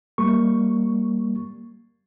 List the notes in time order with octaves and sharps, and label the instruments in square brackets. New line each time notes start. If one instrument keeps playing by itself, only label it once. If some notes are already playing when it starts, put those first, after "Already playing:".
[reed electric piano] G3 A#3 C#6